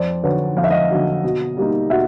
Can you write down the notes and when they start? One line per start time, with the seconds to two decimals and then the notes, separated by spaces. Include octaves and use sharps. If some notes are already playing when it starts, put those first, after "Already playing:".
Already playing: F2 C5 D5
0.23 D3 F#3 B4 C#5
0.57 F2 F5
0.64 E5
0.70 D#5 F5
0.91 D3 F#3
1.24 B2
1.57 G3 A#3 D#4
1.90 B2 E5 F#5